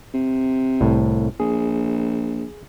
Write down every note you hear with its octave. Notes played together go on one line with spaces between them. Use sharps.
C3
C2 A2
A#1 G#4